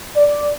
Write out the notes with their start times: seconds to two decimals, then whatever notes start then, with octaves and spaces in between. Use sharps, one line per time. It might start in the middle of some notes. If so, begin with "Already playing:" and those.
0.16 D5